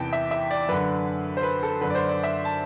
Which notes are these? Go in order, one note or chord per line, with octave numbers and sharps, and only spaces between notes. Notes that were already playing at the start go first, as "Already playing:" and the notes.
Already playing: E2 C3 E3 G5 A5
E5
E5
D5
F#2 D3 B4
C5
B4
A4
F#2 D3 B4
D5
C5
D5
E5
A5